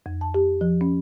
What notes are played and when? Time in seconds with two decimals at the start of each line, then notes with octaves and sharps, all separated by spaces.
0.06 F2
0.21 A5
0.34 G4
0.61 F3
0.81 C#4